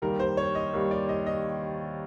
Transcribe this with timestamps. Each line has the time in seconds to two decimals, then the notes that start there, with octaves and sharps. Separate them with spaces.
0.02 D#2 D#3 G3 A#4
0.20 C5
0.37 C#5
0.55 D#5
0.73 D#2 D#3 G3
0.91 D5
1.09 D#5
1.26 D#5